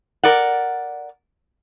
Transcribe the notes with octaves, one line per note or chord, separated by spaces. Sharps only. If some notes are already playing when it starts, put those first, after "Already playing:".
A#4 D5 F#5